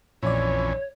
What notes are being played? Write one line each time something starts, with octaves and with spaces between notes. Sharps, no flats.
A#1 F2 E3 C#4 C#5 D5